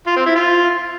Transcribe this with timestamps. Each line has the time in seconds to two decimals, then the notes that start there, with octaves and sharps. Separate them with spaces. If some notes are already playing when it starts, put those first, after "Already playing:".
0.07 F4
0.16 C4
0.26 E4
0.35 F4